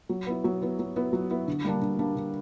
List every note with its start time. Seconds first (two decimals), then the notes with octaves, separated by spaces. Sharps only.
0.09 F#3
0.27 B3 E4
0.44 F#3
0.62 B3 E4
0.79 F#3
0.96 B3 E4
1.13 F#3
1.30 B3 E4
1.47 D3
1.64 G3 A#3 D4
1.82 D3
1.99 G3 A#3 D4
2.16 D3